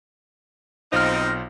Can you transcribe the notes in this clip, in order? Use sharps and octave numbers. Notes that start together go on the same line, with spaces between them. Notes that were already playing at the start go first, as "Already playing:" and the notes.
B1 C4 D#4 F4 C5 F6 A#6